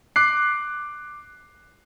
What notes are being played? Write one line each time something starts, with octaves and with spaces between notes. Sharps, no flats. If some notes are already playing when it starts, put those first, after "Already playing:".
D6 F#6 C7